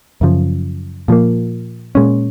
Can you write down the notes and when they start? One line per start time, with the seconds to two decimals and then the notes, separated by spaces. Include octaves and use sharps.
0.21 F#2 C#3 F3
1.08 A#2 F3 A#3
1.95 A#2 G#3 C#4